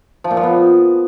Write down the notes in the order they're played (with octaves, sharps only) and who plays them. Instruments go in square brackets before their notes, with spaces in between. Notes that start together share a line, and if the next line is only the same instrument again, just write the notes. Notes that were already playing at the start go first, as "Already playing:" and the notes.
[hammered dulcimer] F3
A#2
F3
B3